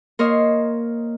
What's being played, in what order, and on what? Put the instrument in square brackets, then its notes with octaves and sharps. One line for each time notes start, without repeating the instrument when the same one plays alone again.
[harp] A#3 A#4 C5 C#5 D#5